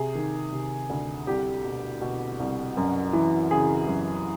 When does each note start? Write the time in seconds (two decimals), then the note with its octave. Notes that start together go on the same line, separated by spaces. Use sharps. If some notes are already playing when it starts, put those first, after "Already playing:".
Already playing: C3 G#4
0.15 D#3
0.52 C3
0.90 D2
1.27 C2 G4
1.64 B2
2.01 B2
2.40 C2
2.77 F#2
3.13 E3
3.51 C#3 G#4
3.88 F#2